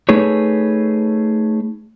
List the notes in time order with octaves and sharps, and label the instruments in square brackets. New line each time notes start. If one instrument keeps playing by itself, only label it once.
[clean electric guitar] A3 D#4 G#4 B4 C#5